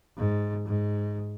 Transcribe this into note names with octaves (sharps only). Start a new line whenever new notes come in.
G#2
G#2